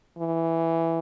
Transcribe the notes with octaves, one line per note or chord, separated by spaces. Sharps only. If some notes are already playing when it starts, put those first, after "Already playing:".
E3